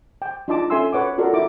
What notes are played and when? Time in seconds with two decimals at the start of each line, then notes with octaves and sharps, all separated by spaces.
0.22 G5
0.48 D4 D#4 F4 D#5 A5 D6
0.70 C#4 A4 E5 G#5 C6 E6
0.93 B4 C#5 F#5 D6
1.18 F4 F#4 A4 A#4 D5
1.33 E4 D6